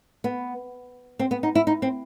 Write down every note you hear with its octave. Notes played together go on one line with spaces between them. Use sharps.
B3
C4
B3
D#4
E4
D#4
C4